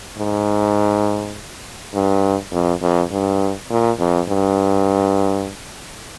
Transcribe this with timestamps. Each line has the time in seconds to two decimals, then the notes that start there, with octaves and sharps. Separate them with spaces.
0.18 G#2
1.94 G2
2.52 F2
2.82 F2
3.11 G2
3.70 A#2
4.00 F2
4.29 G2